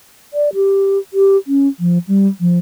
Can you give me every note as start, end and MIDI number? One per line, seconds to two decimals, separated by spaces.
0.33 0.53 74
0.54 0.98 67
1.13 1.37 67
1.47 1.68 61
1.80 1.98 53
2.08 2.27 55
2.40 2.58 53